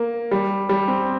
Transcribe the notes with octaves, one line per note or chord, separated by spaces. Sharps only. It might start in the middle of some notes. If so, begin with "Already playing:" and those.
Already playing: A#3
G3
G3
C4